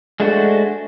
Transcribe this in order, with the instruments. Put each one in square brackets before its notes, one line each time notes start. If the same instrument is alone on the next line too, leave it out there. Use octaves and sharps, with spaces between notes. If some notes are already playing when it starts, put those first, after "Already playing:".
[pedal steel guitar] G#3 A3 D4 F#4 C5